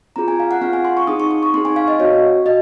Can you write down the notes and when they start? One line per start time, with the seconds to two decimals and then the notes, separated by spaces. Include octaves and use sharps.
0.16 C4 F4 G#4 A#5
0.28 G#5
0.40 F5
0.51 F#5
0.61 C4 F4 G#4 F5
0.73 G#5
0.85 C6
0.97 C#6
1.07 C4 D#4 G#4 D#6
1.20 C#6
1.31 C#6
1.43 C#6
1.54 C4 D#4 G#4 C6
1.65 G#5
1.76 F5
1.88 D#5
2.00 C4 F#4 C#5
2.45 F#4 D#5